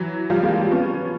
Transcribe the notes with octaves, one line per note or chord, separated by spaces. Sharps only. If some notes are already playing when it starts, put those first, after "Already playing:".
Already playing: E3 F#3
F3 G3
G#3 A#3
B3 C#4